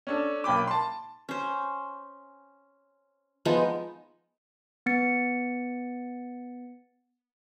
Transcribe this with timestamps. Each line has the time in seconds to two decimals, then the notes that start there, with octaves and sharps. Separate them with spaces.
0.07 C#4 D4 A4
0.44 B1 A#3 G5 B5 D6
0.67 A5 C6
1.29 C#4 C5
3.45 F3 G#3 B3 D#4
4.86 B3 A6 C#7